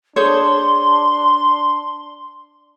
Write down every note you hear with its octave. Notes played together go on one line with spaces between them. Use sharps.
D4 G#4 C5 C#5 C6